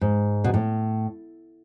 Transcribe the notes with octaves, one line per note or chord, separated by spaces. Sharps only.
G#2
B2
A2